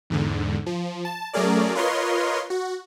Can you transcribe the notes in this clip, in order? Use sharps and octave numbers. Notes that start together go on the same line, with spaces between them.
E2 G#2 D3
F3
A5
F#3 A3 C#4 G#4 A#4 D5
F4 A#4 B4 C#5 D#5 C6
F#4